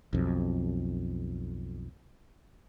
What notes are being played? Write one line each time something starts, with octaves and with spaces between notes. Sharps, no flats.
B1 F2